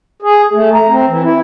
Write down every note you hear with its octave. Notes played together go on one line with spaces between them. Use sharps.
G#4
A3
A#5
C4
E3
E4